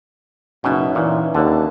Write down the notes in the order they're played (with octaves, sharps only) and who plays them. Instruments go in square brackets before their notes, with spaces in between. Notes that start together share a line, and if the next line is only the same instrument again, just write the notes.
[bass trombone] F#1 [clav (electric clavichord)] B2 [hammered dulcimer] C#4 D#4 E5
[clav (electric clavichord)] A#2 [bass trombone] E3
[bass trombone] D#2 [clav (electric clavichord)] D3 [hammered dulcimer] A5